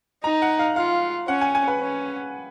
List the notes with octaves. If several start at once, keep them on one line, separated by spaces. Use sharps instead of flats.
D#4 A#5
F#5
F5
F4 F5
C#4 F#5
G#5
G#5
B4
C#4